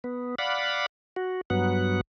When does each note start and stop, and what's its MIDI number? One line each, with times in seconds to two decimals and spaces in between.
0.04 0.35 59
0.39 0.86 74
0.39 0.86 77
0.39 0.86 78
0.39 0.86 83
1.16 1.41 66
1.50 2.01 43
1.50 2.01 54
1.50 2.01 59
1.50 2.01 78